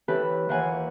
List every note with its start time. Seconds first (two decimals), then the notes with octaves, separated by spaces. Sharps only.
0.08 E3 C#4 E4 G4 A4 B4
0.49 D#2 E3 F4 F#5 G#5